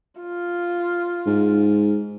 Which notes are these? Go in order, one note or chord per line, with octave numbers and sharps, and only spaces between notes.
F4
G#2